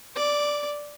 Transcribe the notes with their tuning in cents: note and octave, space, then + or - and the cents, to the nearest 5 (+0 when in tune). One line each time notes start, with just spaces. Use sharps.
D5 +0 D6 -25